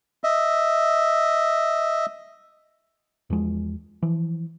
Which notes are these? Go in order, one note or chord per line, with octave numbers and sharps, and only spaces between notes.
D#5 E5
E2 F3 G#3
E3 F3